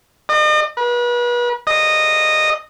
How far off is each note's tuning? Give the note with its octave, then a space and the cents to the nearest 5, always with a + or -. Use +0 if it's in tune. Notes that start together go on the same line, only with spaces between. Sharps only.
D#5 -40
B4 -35
D#5 -10